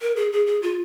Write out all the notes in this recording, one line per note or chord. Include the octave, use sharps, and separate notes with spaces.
A#4
G#4
G#4
G#4
F4